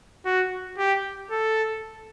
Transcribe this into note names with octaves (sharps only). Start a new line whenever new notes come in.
F#4
G4
A4